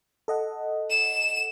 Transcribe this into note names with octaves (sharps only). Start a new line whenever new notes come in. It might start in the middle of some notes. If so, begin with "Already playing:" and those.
A4 D#5 F#5
E7